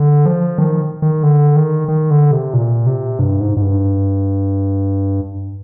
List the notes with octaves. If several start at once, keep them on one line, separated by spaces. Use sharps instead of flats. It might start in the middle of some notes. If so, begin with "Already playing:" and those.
Already playing: D3
F3
D#3
D#3
D3
D#3
D#3
D3
C3
A#2
C3
G2
G#2
G#2
G2